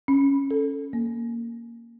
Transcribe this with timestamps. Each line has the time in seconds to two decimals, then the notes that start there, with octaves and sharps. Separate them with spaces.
0.08 C#4
0.51 A4
0.93 A#3